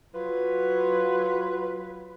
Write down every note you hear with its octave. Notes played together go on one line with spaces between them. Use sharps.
F#3 F4 B4